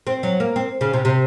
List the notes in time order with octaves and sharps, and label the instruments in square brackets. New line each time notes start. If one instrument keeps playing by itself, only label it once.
[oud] C4
F#3
A#3
C4
C#3
C3
C3